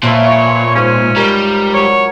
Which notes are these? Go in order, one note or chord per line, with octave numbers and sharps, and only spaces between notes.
A#2 F3 C#4 F4 B4 E5 C#6
C#5
G#2 C#4
G3 A#4
F#3 C#5